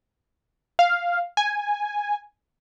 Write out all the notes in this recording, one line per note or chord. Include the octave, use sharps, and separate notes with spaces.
F5
G#5